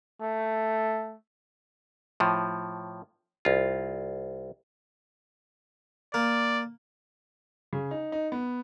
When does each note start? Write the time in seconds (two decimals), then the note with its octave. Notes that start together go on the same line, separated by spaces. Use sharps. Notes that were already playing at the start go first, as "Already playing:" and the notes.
0.21 A3
2.20 A2 F3
3.45 C2 F4
6.14 A#3 D5
7.73 C#3
7.91 D#4
8.12 D#4
8.32 B3